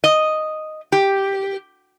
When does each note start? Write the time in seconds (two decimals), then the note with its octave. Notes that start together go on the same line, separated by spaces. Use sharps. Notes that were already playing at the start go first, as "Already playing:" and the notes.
0.04 D#5
0.92 G4